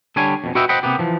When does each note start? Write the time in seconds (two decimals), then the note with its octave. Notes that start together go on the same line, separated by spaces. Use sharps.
0.16 D3 G3 D4 C#5 G#5
0.44 F2 B2
0.55 F#4 B4 D#5 E5 G5
0.69 C5 D#5 F#5 G5 B5
0.83 C3 A#3 B3 G4
0.99 E3 F3